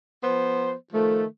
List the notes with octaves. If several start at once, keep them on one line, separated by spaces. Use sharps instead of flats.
F3 B3 C5
D#3 F3 A3